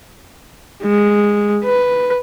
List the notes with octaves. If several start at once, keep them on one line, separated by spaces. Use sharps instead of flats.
G#3
B4